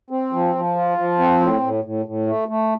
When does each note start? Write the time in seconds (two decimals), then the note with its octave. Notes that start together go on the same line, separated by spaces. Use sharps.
0.10 C4
0.33 F3
0.55 F3
0.76 F4
0.98 F3
1.19 C4
1.40 A2
1.62 A2
1.84 A2
2.06 A2
2.27 A3
2.48 A3